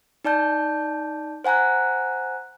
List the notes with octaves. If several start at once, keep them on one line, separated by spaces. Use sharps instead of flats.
D#4 D5 A5 G6
C5 F#5 G#5 A#5 F#6